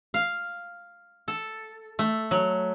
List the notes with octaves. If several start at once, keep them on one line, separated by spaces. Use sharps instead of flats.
F5
A4
A3
F#3